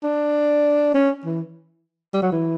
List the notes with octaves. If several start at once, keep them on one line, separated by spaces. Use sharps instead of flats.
D4
C#4
E3
G3
F#3
E3